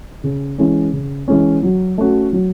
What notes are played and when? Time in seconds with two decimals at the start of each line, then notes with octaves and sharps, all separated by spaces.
0.24 C#3
0.58 E3 G#3 C#4
0.93 C#3
1.28 E3 G#3 C#4
1.63 F#3
1.98 A3 C#4 F#4
2.33 F#3